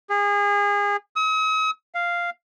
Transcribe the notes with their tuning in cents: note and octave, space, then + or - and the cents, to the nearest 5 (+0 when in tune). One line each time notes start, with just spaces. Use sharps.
G#4 -30
D#6 +45
F5 -5